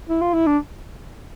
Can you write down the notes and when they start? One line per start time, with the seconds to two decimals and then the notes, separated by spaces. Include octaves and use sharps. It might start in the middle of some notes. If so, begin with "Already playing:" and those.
0.09 E4
0.21 F4
0.34 E4
0.46 D4